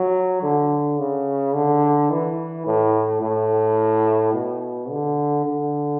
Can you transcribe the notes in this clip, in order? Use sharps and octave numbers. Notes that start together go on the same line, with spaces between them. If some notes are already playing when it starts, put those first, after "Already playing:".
Already playing: F#3
D3
C#3
D3
E3
A2
A2
B2
D3
D3